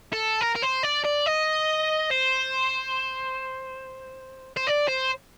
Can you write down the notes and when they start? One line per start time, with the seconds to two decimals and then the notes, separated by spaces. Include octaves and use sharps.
0.13 A4
0.41 A#4
0.55 A#4
0.62 C5
0.83 D5
1.05 D5
1.26 D#5
2.11 C5
4.56 C5
4.67 D5
4.88 C5